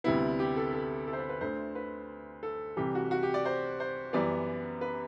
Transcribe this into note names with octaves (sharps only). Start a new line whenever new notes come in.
D2 C3 G3 B3 E4
G4
A4
A4
A4
C5
B4
B4
D2 D3 A3 C5
B4
A4
C2 C3 E3 G3 G4
F#4
F#4
G4
D5
C5
C5
F#2 E3 G3 B3 D5
B4